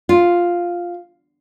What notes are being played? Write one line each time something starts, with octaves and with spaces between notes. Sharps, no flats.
F4